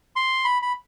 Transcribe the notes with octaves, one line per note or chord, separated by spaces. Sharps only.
C6
B5
B5